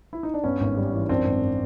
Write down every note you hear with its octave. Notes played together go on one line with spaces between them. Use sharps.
E4
D#4
D4
G2 B3 C#4
G#1
G3
E3
F#2 C4 D4
G#1